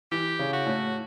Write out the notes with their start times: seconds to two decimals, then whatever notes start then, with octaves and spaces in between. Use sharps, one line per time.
0.12 E3 G4
0.39 C#3
0.53 F#4
0.66 A2